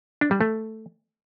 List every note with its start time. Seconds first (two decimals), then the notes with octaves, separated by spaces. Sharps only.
0.21 D4
0.31 G3
0.41 A3